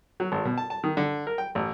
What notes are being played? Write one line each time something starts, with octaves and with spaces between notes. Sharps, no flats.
F#3
G#1
B2
A5
A5
D#3
D3
A#4
G5
A1